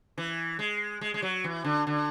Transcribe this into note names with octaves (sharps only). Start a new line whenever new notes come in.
E3
G#3
G#3
G#3
F#3
E3
D3
D3